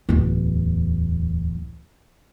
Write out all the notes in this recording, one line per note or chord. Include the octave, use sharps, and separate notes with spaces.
D1 E2